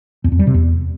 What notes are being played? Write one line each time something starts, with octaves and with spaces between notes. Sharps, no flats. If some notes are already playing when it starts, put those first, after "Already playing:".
E2
F2
G3
C3
E2